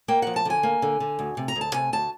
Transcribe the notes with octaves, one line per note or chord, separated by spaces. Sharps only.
A#3 G5
F3 F#5
A5
D3 G#5
A#3
D3
D3
D2
C3
A#5
D2
A5
C3 G#5
D2 A5